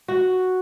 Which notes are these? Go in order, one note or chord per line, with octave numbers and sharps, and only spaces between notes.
F#4